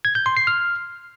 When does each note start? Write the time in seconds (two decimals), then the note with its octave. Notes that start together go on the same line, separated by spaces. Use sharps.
0.05 G#6
0.15 G6
0.26 C6
0.37 C7
0.47 F6